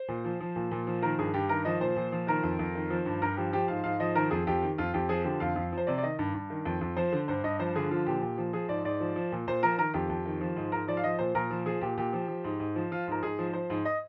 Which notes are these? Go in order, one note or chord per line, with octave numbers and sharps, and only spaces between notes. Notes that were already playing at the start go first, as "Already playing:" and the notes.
Already playing: C5
A#2
F3
F3
A#2
A#2
F3
D#3 A#4
G2 G#4
G2 G4
D#3 A#4
F3 D#5
A#2 C5
A#2
F3
D#3 A#4
F2
F2
D#3
F3
G2
G2 A#4
F3 G4
F3 G4
G#2 F5
G#2 F5
F3 D#5
D#3 A#4
F2 G#4
F2 G4
D#3
F2 F4
F2 G4
F3 G#4
D3 G4
F2 F5
F2
F3
C5
C3 D5
D5
D#3 D#5
G2
G2
D#3
F2
F2
F3 C5
D3
G2 C5
G2 D#5
F3 C5
D3 G#4
F3 F4
A#2 G4
A#2
F3
F3 G#4
G#2 D5
G#2 D5
F3
F3
A#2
A#2 C5
F3 A#4
D#3 A#4
F2 G4
F2
D#3
F3
G#2
G#2 A#4
F3 D5
F5
F3 D#5
A#2 C5
A#2 A#4
F3
F3 G#4
A#2 G4
A#2 G4
F3
F3
G#2
G#2
F3
F3 F4
G#2 A#4
G#2 G#4
F3
F3 C5
G#2
D#5